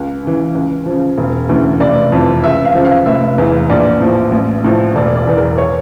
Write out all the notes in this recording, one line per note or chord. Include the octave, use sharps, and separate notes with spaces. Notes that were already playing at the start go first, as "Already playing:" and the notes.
Already playing: C#2
C#3 E3
C#2
C#3 F3
E1
D2 C#3 E3
F1 D5
F2 E3
C#2 E5
F5
C#3 F3
F5
F1 E5
E2 E3
A#1 D5
A2 F3
A1
A2 F3
E1 D5
D5
E2 E3
A#4
C#5